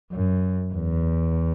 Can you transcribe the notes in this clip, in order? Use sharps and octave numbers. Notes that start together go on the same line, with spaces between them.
F#2
E2